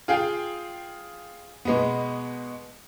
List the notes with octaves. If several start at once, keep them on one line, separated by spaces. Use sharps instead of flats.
F4 G#4 F5 G5
B2 G#3 B3